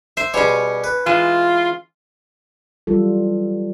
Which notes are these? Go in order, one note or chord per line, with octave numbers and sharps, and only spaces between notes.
C5 E5
B2 G3 C#4 G#4 C#5
B4
E3 G#3 F4 D#5
E3 F#3 G3 F4 A4